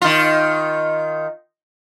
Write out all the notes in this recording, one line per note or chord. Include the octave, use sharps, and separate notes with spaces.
D#3 F4